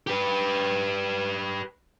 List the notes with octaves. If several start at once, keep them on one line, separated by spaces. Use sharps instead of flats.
G4 B4